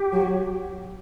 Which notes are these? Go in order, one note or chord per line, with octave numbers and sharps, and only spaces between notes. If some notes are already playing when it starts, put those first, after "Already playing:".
Already playing: G4
F#3